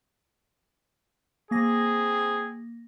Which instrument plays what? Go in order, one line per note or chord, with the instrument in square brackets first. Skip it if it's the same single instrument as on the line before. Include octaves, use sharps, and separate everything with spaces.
[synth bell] A#3 A#6 [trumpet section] C4 G#4